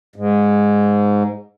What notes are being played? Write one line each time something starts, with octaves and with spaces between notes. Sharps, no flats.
G#2